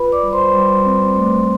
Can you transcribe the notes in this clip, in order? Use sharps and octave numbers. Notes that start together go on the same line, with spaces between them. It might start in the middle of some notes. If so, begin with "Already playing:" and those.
Already playing: F4 B4 B5
D5 D6
G3
D6
C5 C6
G3
C4
A3